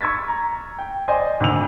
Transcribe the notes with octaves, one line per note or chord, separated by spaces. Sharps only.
C#6 E6 G#6 A6 B6
A#5
G5
C5 D5 D#5 G#5
G#1 D2 E6 F7